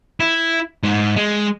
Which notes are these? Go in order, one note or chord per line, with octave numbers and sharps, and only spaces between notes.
E4
G#2
G#3